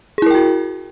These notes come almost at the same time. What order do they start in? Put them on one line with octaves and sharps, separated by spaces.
G#4 E4 A#4 G5 F#4